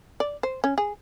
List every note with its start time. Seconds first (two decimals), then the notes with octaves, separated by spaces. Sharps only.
0.20 D5
0.43 C5
0.64 C#4
0.78 G#4